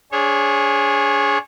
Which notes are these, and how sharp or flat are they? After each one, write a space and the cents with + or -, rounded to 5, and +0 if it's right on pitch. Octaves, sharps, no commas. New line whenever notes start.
D4 -35 G#4 +0 C#5 -25